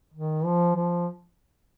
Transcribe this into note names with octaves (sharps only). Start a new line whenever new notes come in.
D#3
F3
F3